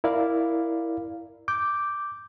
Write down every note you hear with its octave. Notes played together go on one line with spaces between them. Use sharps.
E4 A#4 D5 F5
D6 G6